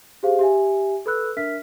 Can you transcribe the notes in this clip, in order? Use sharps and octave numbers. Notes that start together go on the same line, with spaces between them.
G4 G#4 C5 F5
G4 E5 G#5
A4 B4 B5 E6 F#6
D4 A#4 E5 F6 B6